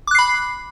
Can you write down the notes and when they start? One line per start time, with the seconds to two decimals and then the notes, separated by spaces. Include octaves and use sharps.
0.07 D6
0.11 F#6
0.15 C7
0.19 B5